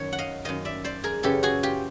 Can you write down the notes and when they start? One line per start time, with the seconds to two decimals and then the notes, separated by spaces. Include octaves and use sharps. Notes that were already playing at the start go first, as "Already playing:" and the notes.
Already playing: F#2 D#3 C#5
0.13 F#5
0.19 D#5 F5
0.45 F#2 D#3 D#5 F5
0.65 D5 E5
0.84 C5 D5
1.04 G#4 A#4
1.23 F#2 C#3 E3 G4 A4
1.43 F#4 G#4
1.63 F4 G4